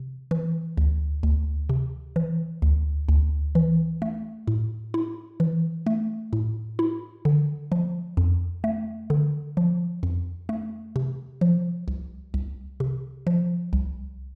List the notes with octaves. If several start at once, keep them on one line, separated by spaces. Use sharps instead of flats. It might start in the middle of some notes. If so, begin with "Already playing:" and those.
Already playing: C3
E3
D2
D2
C3
E3
D2
D2
E3
A3
A2
E4
E3
A3
A2
E4
D3
F3
F2
A3
D3
F3
F2
A3
C3
F3
C2
C2
C3
F3
C2